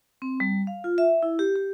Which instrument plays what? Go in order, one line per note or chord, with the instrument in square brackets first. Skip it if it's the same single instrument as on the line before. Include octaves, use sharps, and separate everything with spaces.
[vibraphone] C4
G3
F5
F4
E5
E4
G4
G4